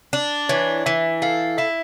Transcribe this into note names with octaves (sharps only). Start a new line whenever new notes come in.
D4
E3 C#5
E3 E5
A4 F5
E4 E5